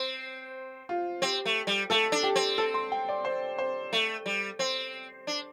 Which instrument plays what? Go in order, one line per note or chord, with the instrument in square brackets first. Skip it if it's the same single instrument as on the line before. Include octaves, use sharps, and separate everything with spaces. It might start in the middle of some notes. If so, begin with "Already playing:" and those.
Already playing: [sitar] C4 [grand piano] C5
[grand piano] F4
[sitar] C4 [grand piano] G4
[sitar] A3
G3
[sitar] A3 [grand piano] A4
[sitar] D4
[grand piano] G4
[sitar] C4
[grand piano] A4
C6
G5
D5
C5
C5
[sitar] A3
G3
[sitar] C4 [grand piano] C5
[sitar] D4